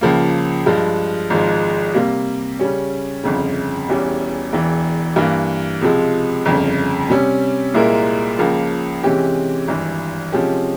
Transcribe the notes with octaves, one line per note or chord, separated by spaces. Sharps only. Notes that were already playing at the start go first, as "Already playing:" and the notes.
C#2 C#3 F3 A#3
G2 F3 G#3
G#1 G#2 F3 G#3
C3 G3 A#3
C#3 G3 C#4
G1 F2 C#3
E1 E2 E3 G3 C#4
E1 E2 E3
G2 E3 A#3
C#2 C3 F3 G#3
G1 F2 C#3
C3 G3 C#4
C2 A#2 G#3 E4 A#4
C#2 C#3 F3 A#3
C3 E3 G#3 C#4 G4
G#1 G2 E3
C3 F3 G#3 C#4 G4